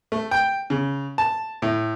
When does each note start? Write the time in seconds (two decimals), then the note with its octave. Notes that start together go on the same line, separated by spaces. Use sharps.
0.12 A3
0.31 G5
0.70 C#3
1.18 A5
1.62 A2